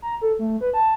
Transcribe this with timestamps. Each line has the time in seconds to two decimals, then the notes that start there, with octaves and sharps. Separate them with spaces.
0.02 A#5
0.21 A4
0.39 A3
0.61 B4
0.74 A5